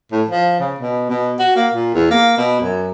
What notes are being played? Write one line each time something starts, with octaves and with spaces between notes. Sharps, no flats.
A2
F3
C#3
B2
B2
F#4
A#3
A#2
E2
A#3
B2
F#2